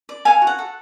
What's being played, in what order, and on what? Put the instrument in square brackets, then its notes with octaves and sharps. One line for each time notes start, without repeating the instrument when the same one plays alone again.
[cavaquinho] D5
A4 F5 G#5
F#4
F#5
A4